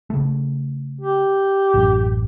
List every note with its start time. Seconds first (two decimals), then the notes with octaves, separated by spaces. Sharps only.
0.10 C#3 A3
1.01 G4
1.74 A1 F#2